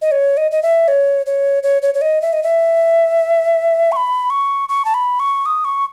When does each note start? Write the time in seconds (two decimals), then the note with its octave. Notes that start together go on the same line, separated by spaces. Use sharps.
0.02 D#5
0.11 C#5
0.37 D#5
0.51 D#5
0.63 E5
0.88 C#5
1.26 C#5
1.63 C#5
1.82 C#5
1.94 C#5
2.01 D#5
2.22 E5
2.33 D#5
2.43 E5
3.92 C#6
3.96 B5
4.30 C#6
4.69 C#6
4.85 A5
4.94 B5
5.20 C#6
5.46 D#6
5.65 C#6